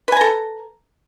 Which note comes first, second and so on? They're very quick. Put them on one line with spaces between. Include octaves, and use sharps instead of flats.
B4 G#5 A#5 A4